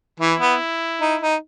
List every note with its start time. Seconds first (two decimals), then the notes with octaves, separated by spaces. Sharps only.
0.20 E3 E4
0.40 B3
1.01 D#4
1.21 D#4